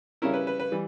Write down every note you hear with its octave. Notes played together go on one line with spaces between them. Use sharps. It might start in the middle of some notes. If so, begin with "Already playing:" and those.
C#3 G3 C#4 E4 A#4
B4
B4
B4
E3 G3